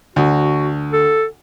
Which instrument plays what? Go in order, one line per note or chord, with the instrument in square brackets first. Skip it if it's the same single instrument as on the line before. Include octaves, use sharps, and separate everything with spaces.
[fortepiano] D2 [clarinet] F#4
[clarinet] A4